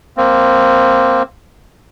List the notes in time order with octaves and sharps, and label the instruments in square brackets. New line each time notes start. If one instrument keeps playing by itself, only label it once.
[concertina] A#3 C4